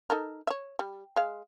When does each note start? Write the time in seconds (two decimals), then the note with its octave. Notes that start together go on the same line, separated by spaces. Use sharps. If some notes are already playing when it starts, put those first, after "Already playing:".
0.10 D#4 A4 A#4
0.47 C#5 E5
0.79 G3
1.16 G#3 F5